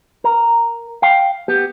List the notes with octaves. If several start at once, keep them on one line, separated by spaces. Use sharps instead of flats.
A#4
F5 G5
B3 G4